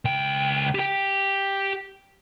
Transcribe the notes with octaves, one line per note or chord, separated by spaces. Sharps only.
C#2 G5
G4 G5